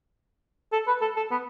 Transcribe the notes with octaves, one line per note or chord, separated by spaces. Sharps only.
A4
B4
A4
A4
B3